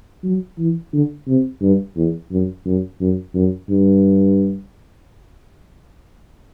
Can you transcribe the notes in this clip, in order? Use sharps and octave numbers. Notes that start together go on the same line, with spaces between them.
F#3
E3
D3
C3
G2
E2
F#2
F#2
F#2
F#2
G2